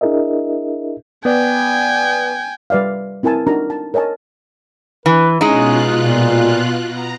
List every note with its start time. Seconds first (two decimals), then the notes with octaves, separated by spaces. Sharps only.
0.01 D4 E4 G#4 A#4 D#5 E5
1.25 B3 B4 D5 G5 G#5
2.70 G3 B4 D5 E5 F5
3.23 C4 E4 A#4 G#5 A5
3.47 D4 D#4 F#4 A#4 A#5
3.70 A5
3.94 A#4 C#5 D#5 G#5 A5
5.06 E3 B4
5.41 B2 G#3 C#4 D#4 F4 F#6
5.99 A#2
6.87 B3 A#5